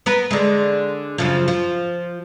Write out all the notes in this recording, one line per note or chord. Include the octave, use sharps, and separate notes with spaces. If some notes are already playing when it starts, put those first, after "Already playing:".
B3 A#4 B4
D3 G#3
F#2 C#3 F3
F3